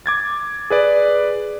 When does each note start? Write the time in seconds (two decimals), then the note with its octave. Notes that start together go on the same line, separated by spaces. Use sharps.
0.06 D6 G#6 A6
0.70 G#4 B4 D5